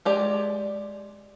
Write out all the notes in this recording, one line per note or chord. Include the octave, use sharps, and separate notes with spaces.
G#3 G4 D5